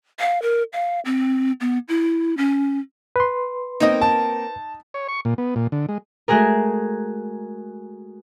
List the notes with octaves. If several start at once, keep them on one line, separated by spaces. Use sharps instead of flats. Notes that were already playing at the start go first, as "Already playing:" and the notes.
F5
A#4
F5
C4
B3
E4
C#4
B4 C6
A#3 C4 D#4 A#4 D#5
A5
C#5
C#6
A#2
B3
A#2
D3
G#3
G#3 A3 F#4 G#4 A#4